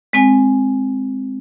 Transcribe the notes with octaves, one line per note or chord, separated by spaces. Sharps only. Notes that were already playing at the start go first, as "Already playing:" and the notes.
G#3 C4 G#5